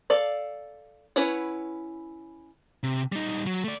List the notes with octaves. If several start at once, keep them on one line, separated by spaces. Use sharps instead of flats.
A4 D5 F5
C#4 E4 B4 C#5 F#5
C3
G3 D#4
F#3
A3 D5